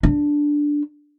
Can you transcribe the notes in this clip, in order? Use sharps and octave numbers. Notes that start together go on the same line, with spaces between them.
D4